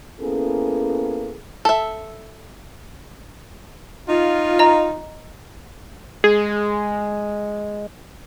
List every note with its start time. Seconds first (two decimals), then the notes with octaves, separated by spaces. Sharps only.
0.21 A#3 B3 C#4 E4 G#4 A4
1.65 A4 E5
4.08 D#4 F4
4.59 D#5 A#5
6.24 G#3 G#4